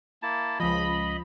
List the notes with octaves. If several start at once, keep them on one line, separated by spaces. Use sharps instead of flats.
A#3 E4 A5
C#2 F3 D#5 B5